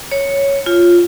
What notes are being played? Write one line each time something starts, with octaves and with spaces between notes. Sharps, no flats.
C#5
F4